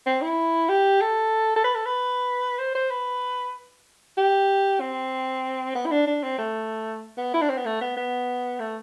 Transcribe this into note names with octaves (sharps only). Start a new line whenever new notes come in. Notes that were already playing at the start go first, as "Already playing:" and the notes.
C4
E4
G4
A4
A4
B4
A4
B4
C5
C5
B4
G4
C4
B3
E4
D4
D4
C4
A3
B3
E4
D4
C4
B3
A3
B3
B3
A3